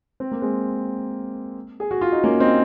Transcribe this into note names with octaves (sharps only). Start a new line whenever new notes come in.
C4
A#3
G#3 C4
G#4
F#4
F4
D#4
A#3 C#4
C4 D#4